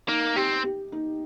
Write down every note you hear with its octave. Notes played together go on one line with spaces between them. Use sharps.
A#3 D#4
C4 G4
G4
D#4